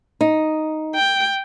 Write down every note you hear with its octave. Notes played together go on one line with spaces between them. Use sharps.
D#4
G5